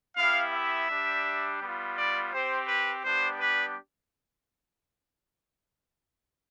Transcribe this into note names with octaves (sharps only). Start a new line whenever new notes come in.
B3 E4 G4 F5
E5
G3 D4 G4
G3 B3 F4
D5
C4 G4 C5
B4
G3 B3 D4 G4 C5
B4